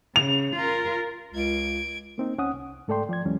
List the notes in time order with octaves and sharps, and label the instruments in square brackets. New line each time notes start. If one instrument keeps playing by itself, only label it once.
[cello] C#3 [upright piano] F7
[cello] F4 A#4
[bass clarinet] C#2 [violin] G#6 D7
[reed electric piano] A#3 C4 D#4
D2 C#4 F#5 D#6
C2
G#2 A3 A4 D5 G5 C6
F3 D5 G#6
D#2 E3 F#3 G#3 C#4